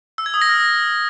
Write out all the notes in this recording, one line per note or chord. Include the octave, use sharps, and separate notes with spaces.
E6
G#6
D#6
A#6
F6